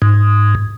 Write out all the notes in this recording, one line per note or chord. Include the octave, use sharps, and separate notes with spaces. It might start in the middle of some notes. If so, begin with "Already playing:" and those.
G#2